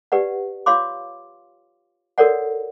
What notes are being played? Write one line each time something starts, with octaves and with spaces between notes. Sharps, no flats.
G4 B4 D5 F#5
F4 C#5 F5 C6 D6
F#4 A4 A#4 C#5 D5 F#5